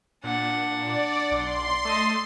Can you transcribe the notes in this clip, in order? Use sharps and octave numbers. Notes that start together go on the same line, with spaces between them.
A#2 D4 F#5
D5
B1 C6
A3 A4 D#5